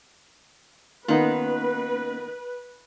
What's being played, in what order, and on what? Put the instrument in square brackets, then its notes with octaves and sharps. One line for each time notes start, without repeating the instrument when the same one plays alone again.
[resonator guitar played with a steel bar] D#3 [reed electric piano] A#3 C#4 [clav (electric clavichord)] B3 D#4 F4 [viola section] B4